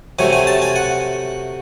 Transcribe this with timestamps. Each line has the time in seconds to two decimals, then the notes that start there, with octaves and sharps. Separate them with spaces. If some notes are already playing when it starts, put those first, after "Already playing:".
0.19 C3 F#3 A3 G#5
0.33 G#5
0.47 A5
0.62 G#5
0.76 F#5